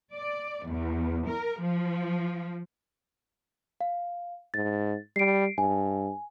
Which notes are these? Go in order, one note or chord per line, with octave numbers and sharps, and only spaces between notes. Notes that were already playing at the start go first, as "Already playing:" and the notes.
D5
E2
A#4
F3
F5
G#2 A6
G3 C7 D7
G2 G#5